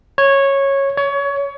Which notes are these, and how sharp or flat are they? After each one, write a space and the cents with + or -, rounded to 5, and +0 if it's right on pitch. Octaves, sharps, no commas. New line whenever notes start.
C#5 -10
C#5 +25